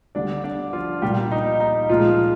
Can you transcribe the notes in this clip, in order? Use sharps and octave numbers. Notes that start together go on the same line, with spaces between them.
D3 G3 D4 D5
D4 D5
F3 F4
A#2 G3 G4
D#4
D#4
A#2 F3 G#3 F4